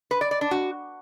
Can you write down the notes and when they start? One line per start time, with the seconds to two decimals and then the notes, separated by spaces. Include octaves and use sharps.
0.11 B4
0.21 D5
0.31 D5
0.41 D4
0.51 F#4